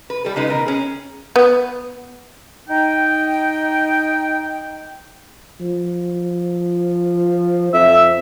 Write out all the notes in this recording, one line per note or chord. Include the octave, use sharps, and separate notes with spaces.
B4
G3 A4
C#3 G#3 D#4 B4
B2 D#3 A#4
C#4 G#4
B3
D#4 G5
F3
F2 E5